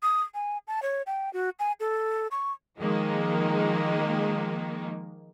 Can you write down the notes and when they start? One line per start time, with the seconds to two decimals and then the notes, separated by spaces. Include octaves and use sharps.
0.03 D#6
0.34 G#5
0.67 A5
0.82 C#5
1.07 G5
1.33 F#4
1.59 G#5
1.80 A4
2.31 C#6
2.79 D#3 F3 G#3 A#3 D#4